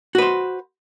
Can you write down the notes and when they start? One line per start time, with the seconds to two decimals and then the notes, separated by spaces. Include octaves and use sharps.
0.15 F#4
0.18 B4
0.22 C5